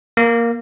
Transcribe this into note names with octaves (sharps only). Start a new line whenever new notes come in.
A#3